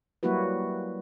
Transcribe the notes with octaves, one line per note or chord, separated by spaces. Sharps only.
F#3 G3 A#3 E4 F#4 B4